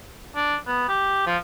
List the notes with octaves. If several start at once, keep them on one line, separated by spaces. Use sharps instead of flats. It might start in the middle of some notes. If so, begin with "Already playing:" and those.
D4
B3
G4
F3